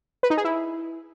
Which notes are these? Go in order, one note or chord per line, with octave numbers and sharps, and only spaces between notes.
B4
D#4
G#4
E4